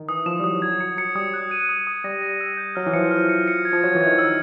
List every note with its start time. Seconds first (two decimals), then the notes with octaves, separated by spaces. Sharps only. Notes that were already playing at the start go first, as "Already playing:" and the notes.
Already playing: D#3
0.09 E3 D#6
0.26 F3 E7
0.39 G3
0.44 F#3 D#6
0.61 F#3 G#6
0.80 F#3 C#7
0.97 F#3 C#7
1.15 G3 D#6
1.34 F#6
1.51 D#7
1.69 D#6
1.87 D#6
2.04 G3 A#6
2.22 A#6
2.40 E6
2.57 G6
2.75 F#3 F6
2.86 E3
2.93 F3 C#7
3.11 F6
3.29 C#7
3.48 C#7
3.65 G#6
3.73 F3
3.83 F#3 G#6
3.95 E3
4.01 G#6
4.07 D#3
4.18 D#3 E6